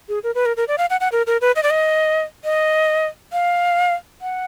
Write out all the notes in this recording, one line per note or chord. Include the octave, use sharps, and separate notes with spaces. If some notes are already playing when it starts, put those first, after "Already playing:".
G#4
A#4
B4
A#4
A#4
D5
F5
F#5
F#5
A#4
A#4
B4
D#5
D5
D#5
D#5
F5
F#5